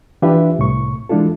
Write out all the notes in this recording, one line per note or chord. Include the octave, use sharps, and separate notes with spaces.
E3 D4 F4 G4 B4 E5
C2 A2 C#6
E3 G#3 D4 E4 F4 A4